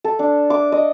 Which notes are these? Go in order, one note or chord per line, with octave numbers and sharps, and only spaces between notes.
A4
D4
D6
D#5